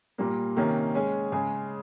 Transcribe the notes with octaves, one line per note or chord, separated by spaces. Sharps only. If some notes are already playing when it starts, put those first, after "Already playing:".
A#2 G3 A#3
C3 D#3 A#3 C#4
G#3 C#4 G#4
C#3 G#3 C#4 G#4